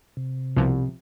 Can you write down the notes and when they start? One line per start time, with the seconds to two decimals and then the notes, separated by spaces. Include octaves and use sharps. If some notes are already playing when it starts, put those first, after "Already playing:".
0.17 C3
0.56 C2 B2 F3